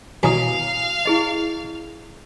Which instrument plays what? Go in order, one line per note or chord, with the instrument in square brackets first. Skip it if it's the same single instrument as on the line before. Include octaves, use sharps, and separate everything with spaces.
[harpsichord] B2 E3 F#3 [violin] F5 [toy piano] G#5 A#5 D#6
[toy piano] E4 G#4 D#5